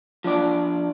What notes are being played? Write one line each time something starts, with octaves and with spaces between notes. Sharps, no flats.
F3 D4 D5